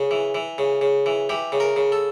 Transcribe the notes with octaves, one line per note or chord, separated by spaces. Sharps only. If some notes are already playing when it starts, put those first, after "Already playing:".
Already playing: C#3
E3
E3
C#3
C#3
E3
E3 G4
C#3
A#4
C#3
A4